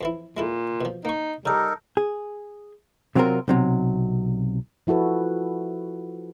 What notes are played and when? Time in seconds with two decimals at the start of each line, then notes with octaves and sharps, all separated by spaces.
0.01 F2 E3 E4
0.37 A#2 G#3 E4 A4
0.81 B2 F3
1.05 A#3 D#4 C#6
1.46 C#3 G3 D#4 A4 A#4 D5
1.97 G#4
3.15 C3 F#3 C4 D4 F4 A#4
3.48 B1 C3 F#3
4.87 F3 E4 F#4 A4 B4